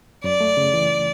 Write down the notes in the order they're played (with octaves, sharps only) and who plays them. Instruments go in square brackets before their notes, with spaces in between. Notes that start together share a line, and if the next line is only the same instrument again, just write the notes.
[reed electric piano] F#2 [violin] D5
[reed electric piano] A3
C#3
E3